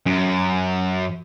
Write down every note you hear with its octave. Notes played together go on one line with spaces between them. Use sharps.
F#2